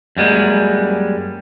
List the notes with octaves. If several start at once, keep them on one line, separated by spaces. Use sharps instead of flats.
F#2 G3 G#3 A#3